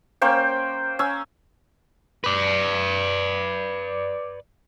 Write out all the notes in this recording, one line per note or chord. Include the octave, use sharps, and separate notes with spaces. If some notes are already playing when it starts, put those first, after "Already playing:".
A#3 C#4 C5 G5
C#4 G#5 E6
B4 D5